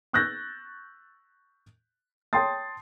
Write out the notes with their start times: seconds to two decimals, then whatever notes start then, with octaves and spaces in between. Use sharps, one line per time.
0.13 C#6 E6 F#6 G6 A6 A#6
2.33 C#5 G5 A5 C6 D#6 A6